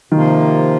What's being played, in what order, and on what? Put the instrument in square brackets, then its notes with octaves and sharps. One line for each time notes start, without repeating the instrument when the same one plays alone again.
[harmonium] C3 F3 A#3 F4 [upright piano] D#3